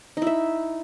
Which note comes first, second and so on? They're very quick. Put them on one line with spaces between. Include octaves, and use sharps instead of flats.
D#4 E4 E5